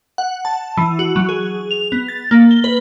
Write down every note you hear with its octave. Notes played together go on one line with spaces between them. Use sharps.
F#5
A5
E3
F#4
F#3
G#4
F7
B3
A6
A#3
G7
B4